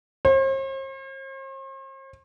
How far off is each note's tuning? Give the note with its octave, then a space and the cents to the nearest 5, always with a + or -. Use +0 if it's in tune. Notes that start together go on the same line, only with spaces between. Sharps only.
C5 +45